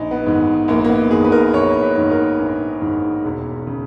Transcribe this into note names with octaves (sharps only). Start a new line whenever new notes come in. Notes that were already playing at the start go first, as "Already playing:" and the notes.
Already playing: A#1 D#4
B3
G#2 D#3
A#1 A#3
A#3
B3
G#2 D#3 G#4
B4
A#4
A#1 C#5
B4
G#2 D#3
A#4
A#1
G#2 D#3
E1
C#3